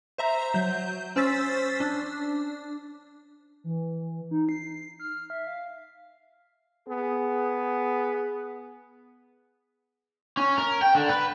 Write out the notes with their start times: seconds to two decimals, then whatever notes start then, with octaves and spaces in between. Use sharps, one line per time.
0.18 C5 E5 A#5
0.54 F#3 G6
1.16 C#4 C5 E6 A6 B6
1.80 D4
3.64 E3
4.31 D#4
4.49 C7
5.00 F6
5.30 E5
5.47 F5
6.88 B3 G#4
10.37 C#4
10.58 A#4
10.82 G5
10.95 D3
11.09 B4